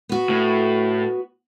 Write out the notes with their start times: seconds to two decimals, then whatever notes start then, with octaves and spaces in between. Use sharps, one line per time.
0.09 B3 F#4
0.29 A2